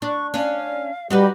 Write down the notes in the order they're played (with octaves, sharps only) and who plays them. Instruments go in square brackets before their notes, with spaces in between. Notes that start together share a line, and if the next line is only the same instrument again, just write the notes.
[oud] D4 [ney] C#6
[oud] C#4 D4 [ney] F5
[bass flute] G3 [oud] D#4 F#4 B4 [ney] G4